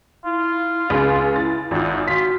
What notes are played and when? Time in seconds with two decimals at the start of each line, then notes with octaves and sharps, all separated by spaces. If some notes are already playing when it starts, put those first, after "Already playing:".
0.25 E4 F4
0.90 C#2 C#3 G#4
1.36 E4 A6
1.71 G#1 F#2 F4
2.08 F4 F#4 B6